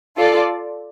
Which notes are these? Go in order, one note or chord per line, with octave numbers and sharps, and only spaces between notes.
F4 A4 D5